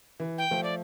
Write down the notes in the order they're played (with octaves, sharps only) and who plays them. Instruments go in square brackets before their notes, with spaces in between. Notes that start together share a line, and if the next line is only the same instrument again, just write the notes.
[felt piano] E3
[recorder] G5
[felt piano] F3 A3
[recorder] D5